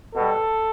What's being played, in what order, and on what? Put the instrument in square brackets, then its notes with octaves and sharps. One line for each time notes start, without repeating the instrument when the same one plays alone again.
[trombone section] B2 G3 A4